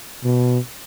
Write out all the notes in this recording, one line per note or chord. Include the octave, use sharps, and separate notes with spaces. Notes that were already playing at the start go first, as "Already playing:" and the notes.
B2